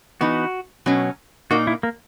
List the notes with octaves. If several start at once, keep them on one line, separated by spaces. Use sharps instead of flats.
E3 B3 D#4 F#4
B2 F#3 C#4
A#2 A#3 D#4 F#4
E4
A#3